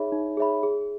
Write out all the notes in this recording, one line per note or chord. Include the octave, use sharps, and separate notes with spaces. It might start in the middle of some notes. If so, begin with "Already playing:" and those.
Already playing: D#4 G#4 C#5 E5 B5
D#4
G#4 C#5 E5 B5
G#4